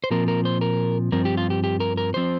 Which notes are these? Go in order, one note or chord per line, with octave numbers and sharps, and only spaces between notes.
C5
A#2 F3 C4 A#4
A#4
C5
A#4
G2 F3 C4 A#4
G4
F4
G4
G4
A#4
A#4
F3 C4 C5